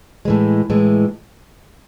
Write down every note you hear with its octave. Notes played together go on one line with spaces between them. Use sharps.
A2 E3 G#3
A2 E3 G#3